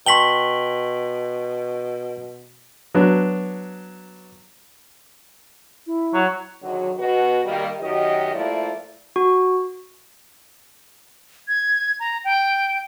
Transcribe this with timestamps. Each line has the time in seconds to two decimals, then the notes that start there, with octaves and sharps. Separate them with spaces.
0.06 B2 G5 A5 C6 C#6 B6 F#7 G7
2.95 F#3 B3 D4
5.87 E4
6.14 F#3
6.62 G#2 D3 D#3 F#3
6.99 B2 F#4 B4
7.45 D#3 G3 A#3
7.80 F#2 D#3 F#4 G4 D#5
8.34 F3 A3 A#3 E4 F4 D5
9.16 F#4
11.48 G#6
12.00 A#5
12.24 G5